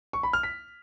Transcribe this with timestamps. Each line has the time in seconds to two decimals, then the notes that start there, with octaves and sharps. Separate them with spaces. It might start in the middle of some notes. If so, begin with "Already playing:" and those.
0.13 C#6
0.23 B5
0.33 F6
0.43 B6